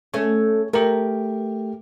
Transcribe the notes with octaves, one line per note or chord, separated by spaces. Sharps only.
A3 C#4 C#5
A3 G4 A#4